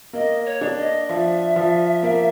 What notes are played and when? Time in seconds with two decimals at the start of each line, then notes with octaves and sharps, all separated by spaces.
0.13 A#3 D#5
0.46 C#5
0.61 D4
0.78 D#5
1.08 F3 E5
1.56 F3
2.03 A#3